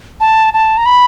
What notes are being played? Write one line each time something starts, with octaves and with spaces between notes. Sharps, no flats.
A5
A5
A#5
B5